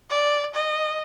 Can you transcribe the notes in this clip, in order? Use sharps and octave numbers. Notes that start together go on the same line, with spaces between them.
D5
D#5